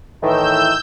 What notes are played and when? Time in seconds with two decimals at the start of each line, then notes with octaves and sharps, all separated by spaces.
0.23 A2 D#3 E3 E6 G6